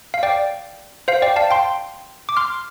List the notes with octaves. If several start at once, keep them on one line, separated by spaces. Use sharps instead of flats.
F5
D5 G5
C5 F5
D5 G5
F5 A5
G5 C6
D6
C6 F6